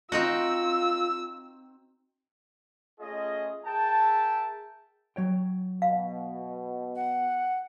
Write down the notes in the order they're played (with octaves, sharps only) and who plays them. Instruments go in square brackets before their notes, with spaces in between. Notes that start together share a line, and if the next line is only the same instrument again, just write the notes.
[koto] C4 D#4 F#4 [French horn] F4 [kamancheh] E6
[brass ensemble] A3 C#4 F4 G#4 D#5
G#4 A#4 E5 G5 A5
[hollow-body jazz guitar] F#3 C#5 G5
[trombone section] B2 [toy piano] F5
[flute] F#5